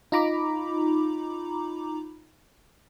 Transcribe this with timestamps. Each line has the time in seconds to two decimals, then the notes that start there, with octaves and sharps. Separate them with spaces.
0.12 D#4 F4 A#5 B5 D6